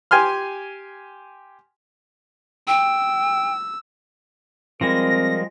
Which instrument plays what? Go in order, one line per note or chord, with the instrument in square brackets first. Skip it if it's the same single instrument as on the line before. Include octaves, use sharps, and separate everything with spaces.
[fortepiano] G4 G#5 C6 F6
[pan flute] G5 [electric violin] E6
[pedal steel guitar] F3 G3 G#3 [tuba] C4 [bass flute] A#4 [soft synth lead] A#6